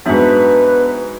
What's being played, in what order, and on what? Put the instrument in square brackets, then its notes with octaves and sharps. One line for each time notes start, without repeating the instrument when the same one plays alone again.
[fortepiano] G#2 F#3 [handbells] B3 D4 E5 [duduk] B4